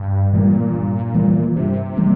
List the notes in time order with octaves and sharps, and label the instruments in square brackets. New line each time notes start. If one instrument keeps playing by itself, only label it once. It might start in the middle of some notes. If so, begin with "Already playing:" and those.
Already playing: [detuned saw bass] G2
[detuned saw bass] A#2 [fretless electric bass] E3 G3 A#3
[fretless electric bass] G2
E3 G3 A#3
[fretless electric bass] G2 [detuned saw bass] C3
[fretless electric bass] E3 G3 A#3